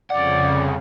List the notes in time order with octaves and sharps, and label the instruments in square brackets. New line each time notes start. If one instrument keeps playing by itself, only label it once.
[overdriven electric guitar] C2 F#5 [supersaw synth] F2 C#3 [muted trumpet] D5